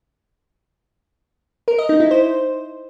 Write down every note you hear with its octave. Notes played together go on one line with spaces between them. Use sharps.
A#4
D#5
D#4
E4
C5